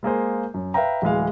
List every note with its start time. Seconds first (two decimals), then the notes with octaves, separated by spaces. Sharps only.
0.03 G#3 A#3 G#4 C5
0.54 F#2
0.74 B4 E5 F5 G5 A#5
1.02 D1 E3 G#3 F5